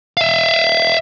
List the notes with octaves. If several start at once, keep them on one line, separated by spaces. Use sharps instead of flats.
E5 F5